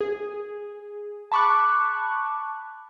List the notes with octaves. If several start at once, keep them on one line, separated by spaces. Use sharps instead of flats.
G#4
A5 B5 C#6 D6 F#6